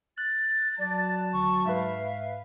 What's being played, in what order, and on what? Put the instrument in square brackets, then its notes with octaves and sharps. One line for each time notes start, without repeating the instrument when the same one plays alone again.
[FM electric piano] F#6 [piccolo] A6
[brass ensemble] F#3 A5 [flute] D5
[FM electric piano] D2 [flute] C#6
[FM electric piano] G#2 B4 [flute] E5 [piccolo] F5